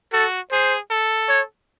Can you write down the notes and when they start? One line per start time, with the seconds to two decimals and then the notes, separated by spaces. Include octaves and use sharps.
0.13 F#4 A4
0.52 G#4 C5
0.90 A4
1.29 C#5